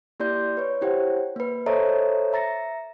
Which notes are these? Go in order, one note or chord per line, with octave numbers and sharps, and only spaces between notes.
A#3 E4 G4 D5 C6 G6
B4 C#5
E4 G4 C5 C#5 F#5
A#3 B4
A4 C5 C#5 D#5 E5 A#5
E5 A#5 A6 A#6 C#7